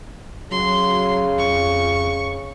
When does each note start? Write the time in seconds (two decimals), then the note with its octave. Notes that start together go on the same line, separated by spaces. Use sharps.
0.51 C#3 F#3 C6
1.38 F2 C#6